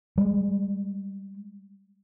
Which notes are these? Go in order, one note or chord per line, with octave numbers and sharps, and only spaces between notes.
G3 G#3